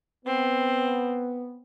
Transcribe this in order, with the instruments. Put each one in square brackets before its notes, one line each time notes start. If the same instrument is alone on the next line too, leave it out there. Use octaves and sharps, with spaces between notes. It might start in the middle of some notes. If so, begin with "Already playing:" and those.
[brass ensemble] B3 [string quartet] C4